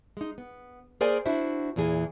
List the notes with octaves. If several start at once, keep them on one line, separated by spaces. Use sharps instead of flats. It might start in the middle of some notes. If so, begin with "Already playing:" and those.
G#3 D#4
B3
A#3 G#4 A#4 C5 D5 G#5
D4 E4 F#4 C5 E5
E2 A#2 E3 G#4